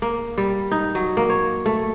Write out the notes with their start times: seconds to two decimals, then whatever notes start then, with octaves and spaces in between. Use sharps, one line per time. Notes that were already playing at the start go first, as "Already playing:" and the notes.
0.02 A#3
0.38 G3
0.71 D#4
0.95 F#3
1.17 A#3
1.30 C#5
1.66 A3